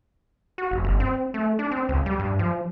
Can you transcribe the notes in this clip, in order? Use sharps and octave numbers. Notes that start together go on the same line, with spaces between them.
F#4
F1
G1
C4
A3
D4
C4
C#2
G3
G2
F3